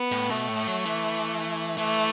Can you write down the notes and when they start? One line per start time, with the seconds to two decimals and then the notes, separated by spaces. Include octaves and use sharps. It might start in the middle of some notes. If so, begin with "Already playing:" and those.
Already playing: B3
0.12 A2
0.30 B2 A3
0.49 A2
0.67 F#3
0.85 E3
1.78 E3 A3